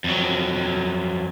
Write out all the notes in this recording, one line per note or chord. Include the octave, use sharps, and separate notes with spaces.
F2 F#3